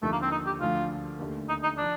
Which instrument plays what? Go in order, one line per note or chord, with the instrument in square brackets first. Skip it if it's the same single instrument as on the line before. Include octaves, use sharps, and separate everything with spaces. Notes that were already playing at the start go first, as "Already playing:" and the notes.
[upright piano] D#2 D3 F3 [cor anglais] A3
[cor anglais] A#3
C4
D#4
G4
[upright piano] D2 D3 F3 [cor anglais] F4
[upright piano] D#2 D3 A3
[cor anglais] D#4
D#4
[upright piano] F3 [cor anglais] D4